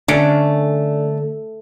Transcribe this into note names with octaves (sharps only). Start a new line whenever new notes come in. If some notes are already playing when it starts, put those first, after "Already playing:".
D3 A3 C#4 D4